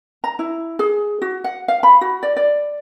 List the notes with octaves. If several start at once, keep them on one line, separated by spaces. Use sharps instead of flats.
A#5
E4
G#4
F#4
F#5
F5
B5
F#4
D5
D5